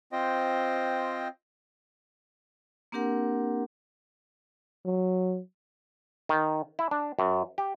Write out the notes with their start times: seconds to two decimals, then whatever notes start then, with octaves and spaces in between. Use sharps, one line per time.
0.12 C4 F4 C5 D#5 G5
2.92 A#3 C4 D4 G4 A#4 F#5
4.85 F#3
6.29 D#3
6.79 E4
6.91 D4
7.19 F#2
7.58 G4